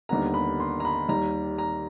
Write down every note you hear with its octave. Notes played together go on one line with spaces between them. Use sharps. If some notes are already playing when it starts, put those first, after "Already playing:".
D#2 D3 G3 B3 A#5
B5
C6
A#5
B5
D#2 D#3 G3 A#5
A#5